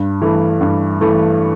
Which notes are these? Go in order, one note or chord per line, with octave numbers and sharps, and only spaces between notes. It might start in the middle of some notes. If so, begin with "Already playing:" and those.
Already playing: G2
E3 A3
G2
E3 A3